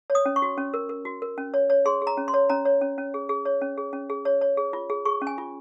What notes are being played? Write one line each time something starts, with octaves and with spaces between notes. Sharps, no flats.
C#5
D#6
C#4
C#6
F#4
C#4
A#4
A#4
F#4
A#4
C#4
C#5
C#5
G#4 C6
G#4
A#5
C#4
C6
C#5
C#4 A#5
C#5
C#4
C#4
G#4
G#4
C#5
C#4
G#4
C#4
G#4
C#5
C#5
G#4
F4
G#4
G#4 C#6
C#4
G#5
F4